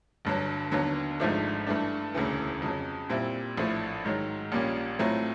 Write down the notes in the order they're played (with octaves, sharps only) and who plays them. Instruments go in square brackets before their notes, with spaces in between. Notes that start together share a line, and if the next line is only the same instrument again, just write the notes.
[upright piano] G1 G2 D3 F#3
D#2 D3 F#3 B3
G#1 G#2 F3 A3 D4
G2 E3 A3 D4
E1 D2 C#3 E3
F2 C#3 F#3
A#2 G3 C4 E4
A#1 A2 F3 A3
G#2 D#3 F#3
A#1 A#2 G3 A#3 C#4
A2 F#3 A3 C4 F4